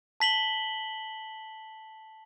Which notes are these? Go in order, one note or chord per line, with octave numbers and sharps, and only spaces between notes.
A5 B6 F#7 G7